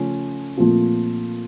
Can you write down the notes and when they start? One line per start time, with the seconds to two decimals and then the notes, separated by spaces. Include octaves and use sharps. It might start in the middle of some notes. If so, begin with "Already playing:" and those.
Already playing: C#3 F3 A3 C#4
0.57 A#2 F3 A3 C4 F4